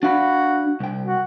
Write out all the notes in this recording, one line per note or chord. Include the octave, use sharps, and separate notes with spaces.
D4 F#4 F5 B5
C2 G5
F#4